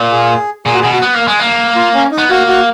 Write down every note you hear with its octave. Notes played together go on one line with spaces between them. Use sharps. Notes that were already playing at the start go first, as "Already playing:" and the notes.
Already playing: A#2
G#4
A#2 G#4
F#4
G#4
B2
F#4
B3
A#3
G#3
A#3
F4
C#4
D#4
B3
A#3 F#4
F#4